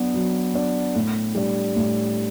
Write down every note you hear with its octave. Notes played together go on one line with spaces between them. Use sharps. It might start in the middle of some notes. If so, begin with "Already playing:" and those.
Already playing: F#3 B3 D4
F#3
B3 D4
A2
G3 D4
A2